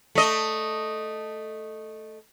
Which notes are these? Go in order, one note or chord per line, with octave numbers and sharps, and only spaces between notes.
A3 D#5